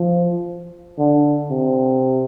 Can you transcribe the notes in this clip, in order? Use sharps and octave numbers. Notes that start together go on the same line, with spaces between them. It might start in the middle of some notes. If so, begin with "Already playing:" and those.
Already playing: F3
D3
C3